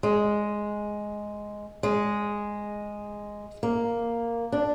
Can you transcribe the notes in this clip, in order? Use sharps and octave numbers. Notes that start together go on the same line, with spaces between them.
G#3
G#3
A#3
D4